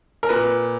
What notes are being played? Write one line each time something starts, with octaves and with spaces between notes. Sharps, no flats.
A#4
A#2 B4